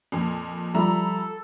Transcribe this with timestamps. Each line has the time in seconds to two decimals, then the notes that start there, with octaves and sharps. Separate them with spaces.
0.12 F2 A#2
0.74 F3 G3 A4 E5 A#5 B5